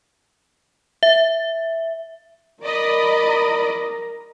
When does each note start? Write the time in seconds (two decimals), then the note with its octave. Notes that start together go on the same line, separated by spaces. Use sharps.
1.03 E5
2.63 A#4 D5 D#5 A#5 B5